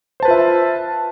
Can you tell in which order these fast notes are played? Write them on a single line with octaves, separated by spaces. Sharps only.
C5 A5 B4 F4 E5